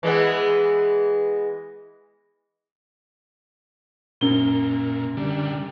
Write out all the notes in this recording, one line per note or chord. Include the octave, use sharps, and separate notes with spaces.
E3 G#3 B3
F#2 A#2 G7
D3 G3